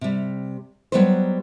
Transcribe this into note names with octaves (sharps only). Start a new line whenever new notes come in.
C3 G3
F#3 G3 B3 D#4 B4 C5